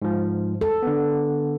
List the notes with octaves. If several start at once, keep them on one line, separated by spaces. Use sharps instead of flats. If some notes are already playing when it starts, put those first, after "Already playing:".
G#2 F3
A4
D3 B3